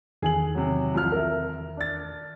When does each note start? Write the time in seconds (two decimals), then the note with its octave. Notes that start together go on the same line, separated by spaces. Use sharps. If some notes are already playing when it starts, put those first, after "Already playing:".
0.22 E2 D#3 G#4 G#5 F#7
0.55 C3 F#3
0.94 C2 F3 F6
1.12 A#4 E5
1.77 D4 A6